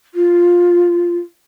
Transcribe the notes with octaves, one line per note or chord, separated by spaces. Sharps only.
F4